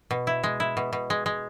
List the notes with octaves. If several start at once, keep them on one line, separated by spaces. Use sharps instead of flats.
B2
E4
G#3
E4
B2
B2
G#3
G#3